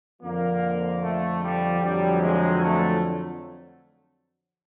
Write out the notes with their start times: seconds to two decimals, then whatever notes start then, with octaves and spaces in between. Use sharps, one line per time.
0.22 F2 D3 F3 A#3
1.02 A3
1.42 G3
1.82 F2 D3 F#3 G3
2.22 G#3
2.61 A3